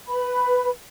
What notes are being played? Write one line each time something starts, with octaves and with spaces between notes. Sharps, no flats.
B4 B5